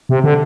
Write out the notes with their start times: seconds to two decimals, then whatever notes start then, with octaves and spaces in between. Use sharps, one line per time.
0.09 C3
0.24 D3